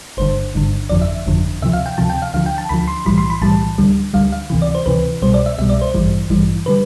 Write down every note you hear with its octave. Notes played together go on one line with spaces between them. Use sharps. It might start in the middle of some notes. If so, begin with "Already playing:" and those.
G1 G2 D3 C5
G1 G2 D3
G1 F2 D3 F3 D5
E5
G1 F2 D3 F3
D2 C3 F3 E5
F5
G5
D2 C3 F3 A5
G5
F5
D2 D3 F3 F5
G5
A5
D2 D3 F3 B5
C6
B1 A2 E3 G3 B5
C6
B5
B1 A2 E3 G3 A5
D2 D3 G3
D2 D3 G3 F5
F5
D2 C3 E3
D5
C5
D2 C3 E3 B4
C2 B2 G3 C5
D5
E5
C2 B2 G3 E5
D5
C5
A1 G2 E3 G3
A1 G2 E3 G3
D3 G3 B4